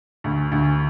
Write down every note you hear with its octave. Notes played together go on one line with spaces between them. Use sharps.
D2
D2